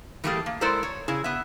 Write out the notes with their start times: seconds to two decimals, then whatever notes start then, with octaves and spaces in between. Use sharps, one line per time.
0.24 E3 G3 A3 A#3 G4 G#4
0.46 A#3
0.61 G#3 E4 A4 A#4 C5 D5
0.83 C#5
1.08 C#3 E4 G#4
1.24 B3 E5